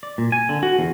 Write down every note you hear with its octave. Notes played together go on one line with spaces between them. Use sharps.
D5
A#2
G#5
D3
F#4
E2